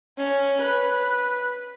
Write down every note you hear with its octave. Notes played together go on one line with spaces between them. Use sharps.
C#4
B4